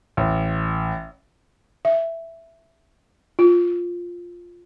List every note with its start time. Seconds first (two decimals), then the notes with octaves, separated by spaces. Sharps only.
0.17 A1
1.85 E5
3.39 F4